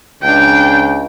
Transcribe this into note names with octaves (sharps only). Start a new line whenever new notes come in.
C#2 D4 G5